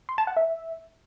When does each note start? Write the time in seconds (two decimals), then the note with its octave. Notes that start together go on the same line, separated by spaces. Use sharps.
0.09 C6
0.18 A5
0.27 F#5
0.37 E5